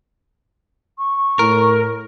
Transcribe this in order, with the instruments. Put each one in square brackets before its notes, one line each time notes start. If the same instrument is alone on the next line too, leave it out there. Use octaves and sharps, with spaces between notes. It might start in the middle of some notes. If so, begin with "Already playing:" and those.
[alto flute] C#6
[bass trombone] A2 [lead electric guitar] A#4